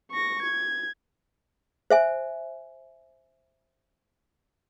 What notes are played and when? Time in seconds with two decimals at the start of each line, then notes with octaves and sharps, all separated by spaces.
0.12 C#6 A#6
0.43 G#6
1.90 C5 E5 G#5